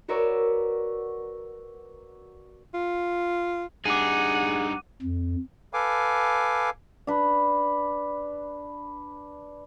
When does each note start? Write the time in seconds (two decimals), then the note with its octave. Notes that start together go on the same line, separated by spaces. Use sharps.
0.08 F#4 A#4 B4 C#5 D5 E6
2.74 F4
3.85 G2 D#4 G#4 F#5 D6 D#7
5.02 F2
5.74 A4 B4 F5 G#5 D6
7.07 D4 B4